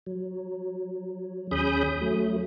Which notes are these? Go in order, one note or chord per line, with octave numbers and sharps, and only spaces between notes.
F#3
D#2 C#4 G#4 B5 D#6 G6
F#3 A3